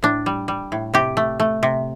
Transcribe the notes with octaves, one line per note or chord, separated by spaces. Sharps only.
A2 D4
G3
G3
A2
C3 G4
A3
A3
C3